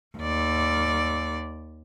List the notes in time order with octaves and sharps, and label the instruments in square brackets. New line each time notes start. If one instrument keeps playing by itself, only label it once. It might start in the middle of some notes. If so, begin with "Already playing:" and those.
[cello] D#2 D5